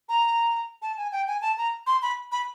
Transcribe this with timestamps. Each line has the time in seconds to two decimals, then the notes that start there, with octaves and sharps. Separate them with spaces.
0.09 A#5
0.82 A5
0.97 G#5
1.12 G5
1.27 G#5
1.41 A5
1.58 A#5
1.87 C6
2.02 B5
2.32 B5